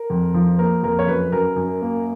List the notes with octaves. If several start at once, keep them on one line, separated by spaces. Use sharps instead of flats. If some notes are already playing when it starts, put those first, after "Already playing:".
Already playing: A#4
F2
F3
A#3 A#4
F2 A#4
C#5
F#2 B4
F#2 A#4
F#2
A#3